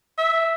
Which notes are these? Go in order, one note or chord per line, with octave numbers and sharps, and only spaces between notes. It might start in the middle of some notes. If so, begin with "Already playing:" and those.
E5